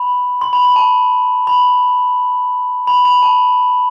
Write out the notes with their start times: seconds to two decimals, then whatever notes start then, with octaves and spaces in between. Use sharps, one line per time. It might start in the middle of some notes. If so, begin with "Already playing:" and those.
Already playing: B5
0.41 C6
0.53 B5
0.65 B5
0.76 A5
1.47 B5
2.87 B5
3.05 B5
3.23 A5